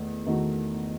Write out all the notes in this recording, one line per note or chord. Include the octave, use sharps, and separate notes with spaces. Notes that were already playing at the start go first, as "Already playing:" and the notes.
Already playing: E2 D#3 A3
E2 D#3 A3 D#4 F#4